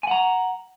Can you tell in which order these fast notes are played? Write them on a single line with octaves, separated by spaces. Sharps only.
G#5 F#5 A#5